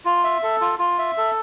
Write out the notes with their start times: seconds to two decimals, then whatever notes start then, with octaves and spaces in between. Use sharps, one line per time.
0.05 F4
0.24 E5
0.43 A4
0.61 F4
0.79 F4
0.99 E5
1.17 A4